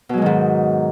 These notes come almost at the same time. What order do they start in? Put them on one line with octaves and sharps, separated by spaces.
B2 F#3 G#3 D#3 G#2